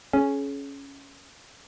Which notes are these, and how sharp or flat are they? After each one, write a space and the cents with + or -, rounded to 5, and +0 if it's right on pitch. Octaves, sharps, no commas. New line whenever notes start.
C#4 +0 G#4 +35